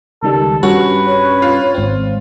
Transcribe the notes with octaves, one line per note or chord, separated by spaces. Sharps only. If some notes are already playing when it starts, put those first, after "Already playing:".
C#2 D#3 G3 A4
G2 C#4 F#4 B4 F#6
C#5
F4
G#1 C4